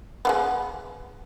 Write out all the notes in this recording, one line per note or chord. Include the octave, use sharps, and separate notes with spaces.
G#3 A#3 B3